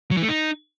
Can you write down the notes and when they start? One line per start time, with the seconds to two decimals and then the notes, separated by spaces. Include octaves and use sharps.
0.11 F#3
0.17 E3
0.23 A3
0.29 D#4